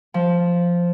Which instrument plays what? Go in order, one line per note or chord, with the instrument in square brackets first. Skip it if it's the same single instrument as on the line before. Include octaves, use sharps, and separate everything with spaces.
[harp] F3